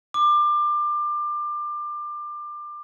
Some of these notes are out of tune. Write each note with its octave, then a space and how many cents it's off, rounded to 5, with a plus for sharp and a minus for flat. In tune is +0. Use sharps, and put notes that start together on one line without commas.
D6 +25